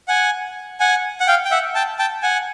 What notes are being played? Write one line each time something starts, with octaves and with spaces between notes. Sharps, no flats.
F#5 G#5
F#5 G#5
F#5
F5 G5
G5
E5 F#5
G5 A5
G5 A5
F#5 G#5